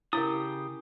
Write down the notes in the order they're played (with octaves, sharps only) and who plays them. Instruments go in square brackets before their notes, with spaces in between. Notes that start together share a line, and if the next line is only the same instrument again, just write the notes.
[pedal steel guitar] C#3 G4 D#6 [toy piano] E4 A#4